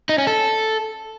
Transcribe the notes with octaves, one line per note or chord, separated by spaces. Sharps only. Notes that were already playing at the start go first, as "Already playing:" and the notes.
D#4
C#4
A4